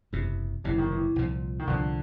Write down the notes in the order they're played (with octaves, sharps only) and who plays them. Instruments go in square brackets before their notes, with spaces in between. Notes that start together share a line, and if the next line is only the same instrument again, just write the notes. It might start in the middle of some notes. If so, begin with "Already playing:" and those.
[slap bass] F#1 E2 C3
[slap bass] F#1 E2 C3 [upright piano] E3
[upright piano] D#3
E3
[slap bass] C2 A#2 F3
[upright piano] D#3
[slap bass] C2 A#2 F3 [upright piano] D3